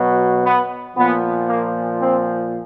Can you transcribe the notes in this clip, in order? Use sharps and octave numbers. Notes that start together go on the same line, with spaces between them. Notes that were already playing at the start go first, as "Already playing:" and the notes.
Already playing: B2 F#3
B3
A#2 F3 B3
A#3
C4